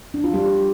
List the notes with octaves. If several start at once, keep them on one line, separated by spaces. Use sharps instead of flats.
D4
F4
G3 G4